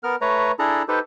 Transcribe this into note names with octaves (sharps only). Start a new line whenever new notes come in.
B3 A#4 F6
A3 B4 C#5 A#5
D4 E4 G#4 A4 A5 A#5
D#4 G4 A4 B4 C5